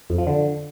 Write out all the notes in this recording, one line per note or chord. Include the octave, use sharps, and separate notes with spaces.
F2
F3
D3